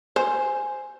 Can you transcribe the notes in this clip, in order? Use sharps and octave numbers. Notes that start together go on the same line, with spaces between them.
C5 G#5